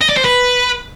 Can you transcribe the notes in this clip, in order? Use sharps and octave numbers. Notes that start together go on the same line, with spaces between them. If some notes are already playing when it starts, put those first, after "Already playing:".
D#5
D5
C5
B4